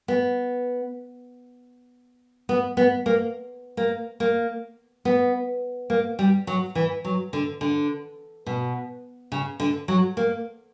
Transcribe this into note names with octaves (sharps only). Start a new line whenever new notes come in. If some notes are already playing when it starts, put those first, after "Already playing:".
B3
B3
B3
A#3
A#3
A#3
B3
A#3
G3
F#3
E3
F#3
D3
D3
B2
C#3
D3
F#3
A#3